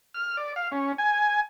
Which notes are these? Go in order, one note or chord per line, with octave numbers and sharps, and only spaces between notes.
F6
D5
F5
C#4
G#5